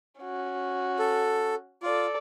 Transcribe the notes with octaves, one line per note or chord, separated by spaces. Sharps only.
C#4 F#4
A4
F4 A4 D5